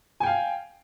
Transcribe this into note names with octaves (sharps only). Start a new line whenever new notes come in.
F5 G5 G#5